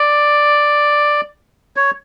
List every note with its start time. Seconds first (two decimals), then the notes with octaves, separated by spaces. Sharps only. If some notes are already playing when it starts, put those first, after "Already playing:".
Already playing: D5
1.76 C#5